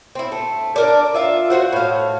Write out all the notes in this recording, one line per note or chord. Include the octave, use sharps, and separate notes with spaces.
C4 E4
A3
D4 A#4 D5
F4 E5 F5
F#4 A#4 C5 F#5
A2 F5